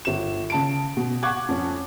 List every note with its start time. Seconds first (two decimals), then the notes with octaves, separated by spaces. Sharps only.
0.05 G1 E7
0.50 C#3 A5 D7
0.97 B2
1.23 F#5 C#6 D6 F#6 G#6
1.49 F2 C#4